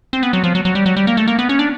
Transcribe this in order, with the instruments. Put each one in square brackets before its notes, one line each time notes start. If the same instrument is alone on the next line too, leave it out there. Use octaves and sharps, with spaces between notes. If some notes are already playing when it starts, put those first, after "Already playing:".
[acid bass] C4
B3
F#3
F3
F#3
F#3
G3
F#3
G3
A#3
A3
A#3
B3
C#4
D4